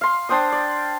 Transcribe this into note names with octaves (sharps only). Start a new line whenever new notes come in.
F5 C6
D4 C5 G5 D#6
D5